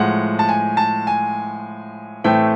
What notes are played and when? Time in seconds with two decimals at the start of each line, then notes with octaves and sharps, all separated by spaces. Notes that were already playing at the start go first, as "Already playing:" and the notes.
Already playing: A2 F3 G#3 F#5
0.39 A5
0.49 G#5
0.77 A5
1.07 G#5
2.24 A2 E3 A3 C4 G5